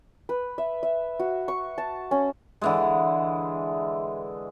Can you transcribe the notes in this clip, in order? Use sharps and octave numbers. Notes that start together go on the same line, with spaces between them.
B4
E5
E5
F#4
C#6
A5
C#4
D3 E3 G#3